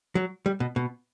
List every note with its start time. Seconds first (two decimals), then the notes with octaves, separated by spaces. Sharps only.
0.15 F#3
0.46 G3
0.60 B2
0.76 B2